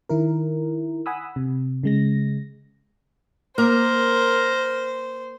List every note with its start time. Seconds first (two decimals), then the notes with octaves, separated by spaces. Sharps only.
0.09 D#3 E4 A#4
1.06 F#5 G#5 B5 D#6 E6
1.36 C3
1.83 C#3 G#3 A#6
3.58 A#3 A#4 C5